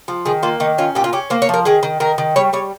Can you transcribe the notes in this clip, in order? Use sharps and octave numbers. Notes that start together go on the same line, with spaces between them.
F3
D#3 G#4
A#3 F4
D#3 D#4
C#4 F4
A#2 G4
F4
C#4 G4
A#3 C5
C#5
F3 A#4
D#3 G#4
D#3
D#3 A#4
D#3
G3 C#5
G3 C#5